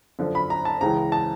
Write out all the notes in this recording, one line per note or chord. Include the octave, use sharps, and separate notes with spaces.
F#2 D3 F3
B5
A#5
A5
C#2 C#3 E3 A#5
A5